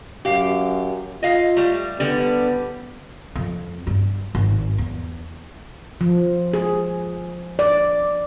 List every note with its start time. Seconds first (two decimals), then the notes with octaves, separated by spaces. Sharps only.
0.25 F#2 G4 F5
1.23 F4 D#5 F5
1.57 G3 A3
2.00 D3 G3 B3
3.35 F2
3.87 G2
4.35 G#1
4.78 E2
6.01 F3
6.54 G#4
7.59 D5